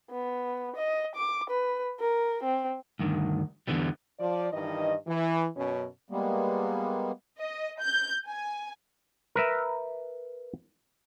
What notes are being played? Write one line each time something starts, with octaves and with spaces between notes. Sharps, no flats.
B3
D#5
D6
B4
A#4
C4
D2 G2 D#3
E2 G2 D3 E3 G3
F3 D5
G2 D#3 E3 D#5
E3
F#2 B2 C#4
G3 G#3 A#3 B3
D#5
G6
G#5
A#4 B4 E5